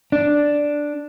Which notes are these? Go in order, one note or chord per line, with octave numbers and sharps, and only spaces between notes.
D4